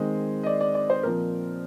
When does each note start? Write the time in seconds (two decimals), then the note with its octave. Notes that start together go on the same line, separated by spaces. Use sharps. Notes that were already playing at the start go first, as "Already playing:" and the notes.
Already playing: D#3 G#3 C4 C5
0.43 D#5
0.46 D5
0.61 D5
0.75 D5
0.90 C5
1.03 A#2 F3 C4 A#4